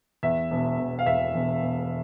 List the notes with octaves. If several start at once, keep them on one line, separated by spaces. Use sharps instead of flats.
E2 E5
E1
E1
F5
E2 E5
E1
E1